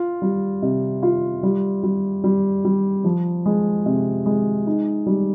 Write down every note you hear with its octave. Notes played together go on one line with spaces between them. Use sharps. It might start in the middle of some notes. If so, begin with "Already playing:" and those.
Already playing: F4
G3
C3
F4
G3
G3
G3
G3
F3
G#3
C3
G#3
D#4
G3